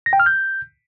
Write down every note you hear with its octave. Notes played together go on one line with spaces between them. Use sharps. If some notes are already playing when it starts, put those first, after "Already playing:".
A#6
G5
F6
G6